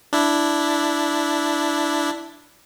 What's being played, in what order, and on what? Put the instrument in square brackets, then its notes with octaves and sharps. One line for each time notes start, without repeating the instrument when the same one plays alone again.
[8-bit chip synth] D4 E4